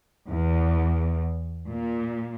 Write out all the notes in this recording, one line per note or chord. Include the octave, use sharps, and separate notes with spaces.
E2
A#2